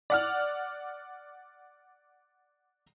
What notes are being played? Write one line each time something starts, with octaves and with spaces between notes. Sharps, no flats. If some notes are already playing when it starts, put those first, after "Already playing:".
D5 F#5 F6